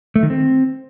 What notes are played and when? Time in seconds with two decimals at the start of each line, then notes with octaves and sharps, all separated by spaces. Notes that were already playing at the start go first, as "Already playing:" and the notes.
0.16 A3
0.23 D#3
0.30 C4